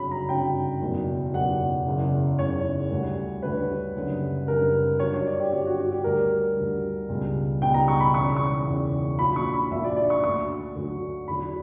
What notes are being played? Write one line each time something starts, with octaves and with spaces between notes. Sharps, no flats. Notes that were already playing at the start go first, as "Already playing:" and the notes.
Already playing: G1 F#2 C#3 F#3 B5
A#5
G1 F#2 C#3 F#3 G5
F#1 E2 B2 F#3
F#1 E2 B2 F#3 F#5
F#1 E2 C#3
F#1 E2 C#3 C#5
D2 D3 G3
D2 D3 G3 B4
F#1 F#2 D3 G3
F#1 F#2 D3 G3 A#4
G1 G2 F#3 C#5
C#5
D5
G4
G1 G2 F#3 G4
F#4
F#4
G4
D2 D3 G3 A#4
D2 D3 G3
C#2 B2 G3
C#2 B2 G3 G5
A#5
C#6
B5
E1 E2 C#3 C#6
C#6
E1 E2 C#3
A#1 A#2 F#3 B5
C#6
B5
A#1 A#2 F#3 E5
D5
D5
C#6
D2 D3 F#3 C#6
D2 D3 F#3
E2 D3 F#3 B5